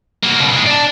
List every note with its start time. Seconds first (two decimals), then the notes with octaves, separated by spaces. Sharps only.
0.23 A#3 F#4
0.39 C#2 B2
0.52 A#2 G#3
0.66 D5 A5